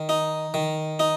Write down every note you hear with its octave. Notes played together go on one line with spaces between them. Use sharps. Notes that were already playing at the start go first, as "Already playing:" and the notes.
Already playing: D#3
D#4
D#3
D#4